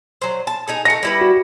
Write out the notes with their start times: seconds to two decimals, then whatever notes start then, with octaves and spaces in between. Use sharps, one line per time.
0.22 F#3 C5
0.47 A5
0.68 D#4 G#4 A4
0.85 A3 D#4 A#6 C#7
1.03 G3 E4 B4
1.21 F#4